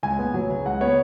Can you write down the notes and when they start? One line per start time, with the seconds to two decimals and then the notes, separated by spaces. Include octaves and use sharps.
0.03 C#2 G#5
0.19 B3
0.34 F#3
0.50 C#3
0.65 C#2 F#5
0.81 B3 C#5